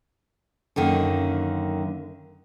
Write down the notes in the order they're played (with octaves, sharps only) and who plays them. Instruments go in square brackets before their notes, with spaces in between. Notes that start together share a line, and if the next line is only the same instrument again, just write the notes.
[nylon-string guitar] F#2 D3 D#3 A#3